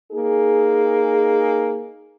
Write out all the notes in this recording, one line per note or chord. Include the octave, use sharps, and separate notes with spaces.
A#3 D#4 G#4